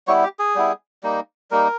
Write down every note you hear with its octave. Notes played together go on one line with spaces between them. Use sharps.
G3 B3 E4 C#5
G4
G#4
G3 B3 E4
G3 A#3 D#4
G3 A#3 D#4 A#4